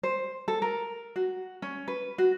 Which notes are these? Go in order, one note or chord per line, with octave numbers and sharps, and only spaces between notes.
C5
A4
A#4
F#4
C#4
B4
F#4